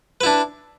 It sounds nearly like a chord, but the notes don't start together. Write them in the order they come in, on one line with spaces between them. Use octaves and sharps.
B4 E4 D4